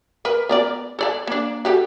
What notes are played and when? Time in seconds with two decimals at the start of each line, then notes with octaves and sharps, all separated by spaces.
0.25 A#4 B4
0.49 B3 A#4 D5
0.99 A4 D5 A5
1.27 A#3 D4
1.65 F#4 G4 A4